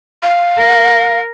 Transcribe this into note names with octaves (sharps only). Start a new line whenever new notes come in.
F5
A#4